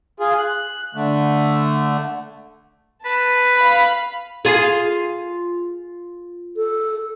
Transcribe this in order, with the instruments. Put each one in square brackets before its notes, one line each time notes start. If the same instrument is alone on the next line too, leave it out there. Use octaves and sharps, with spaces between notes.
[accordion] F4 G#4
F#6
D3 A3
[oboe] B4 [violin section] A5
[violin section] F5 B5
[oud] F4 G#4
[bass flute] A4